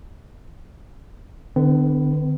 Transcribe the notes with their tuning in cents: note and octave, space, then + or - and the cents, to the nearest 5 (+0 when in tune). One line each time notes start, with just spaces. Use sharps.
D3 +30 C4 -40 B4 +0